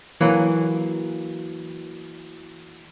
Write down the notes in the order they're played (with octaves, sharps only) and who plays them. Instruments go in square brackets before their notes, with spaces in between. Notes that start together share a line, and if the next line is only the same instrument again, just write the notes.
[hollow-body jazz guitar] E3 F#3 A#3